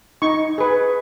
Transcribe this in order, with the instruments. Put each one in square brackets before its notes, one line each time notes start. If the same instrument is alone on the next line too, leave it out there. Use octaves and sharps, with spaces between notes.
[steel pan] D#4 C#6
G#4 B4